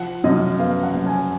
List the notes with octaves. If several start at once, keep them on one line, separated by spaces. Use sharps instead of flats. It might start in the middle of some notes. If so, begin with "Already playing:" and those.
Already playing: F3 F#5
F#2 D#5
B3 F5
F#5
F#1
G#5